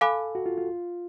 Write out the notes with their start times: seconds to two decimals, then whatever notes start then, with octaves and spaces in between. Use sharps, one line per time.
0.01 A4 F5 G#5 B5 D6 F#6
0.35 F#4
0.46 F4
0.58 F4